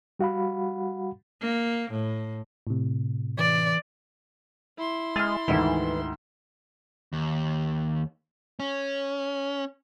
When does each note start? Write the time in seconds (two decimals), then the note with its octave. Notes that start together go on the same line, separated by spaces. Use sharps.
0.19 G3 F#4 F5 F#5 B5
1.42 A#3
1.92 A2
2.67 A2 C3
3.38 E3 D5
4.78 E4 C6
5.16 G#3 F6 A6
5.48 D2 G#2 D#3 E3
7.13 D#2
8.60 C#4